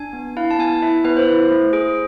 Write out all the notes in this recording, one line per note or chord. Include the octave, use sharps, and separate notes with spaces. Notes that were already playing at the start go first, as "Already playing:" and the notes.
Already playing: D4 G#5
B3
E4 F5
A5
B3 G#5
E4 E5
B3 B4
C5
E4
A3
G#4